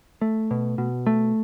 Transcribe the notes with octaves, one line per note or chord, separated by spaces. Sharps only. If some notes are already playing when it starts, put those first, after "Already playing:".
A3
B2
B2
A3